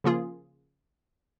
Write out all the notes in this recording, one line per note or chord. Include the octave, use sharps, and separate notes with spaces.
C#3 F3 A#3 F4 G#4